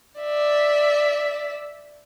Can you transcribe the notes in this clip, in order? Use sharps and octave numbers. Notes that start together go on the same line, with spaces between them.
D5 E5